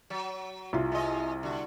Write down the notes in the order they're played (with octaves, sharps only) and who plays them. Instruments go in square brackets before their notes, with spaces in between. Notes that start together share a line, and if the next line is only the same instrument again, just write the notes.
[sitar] F#3
[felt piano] C2 F4
[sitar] G#3 D#5
D3 F#4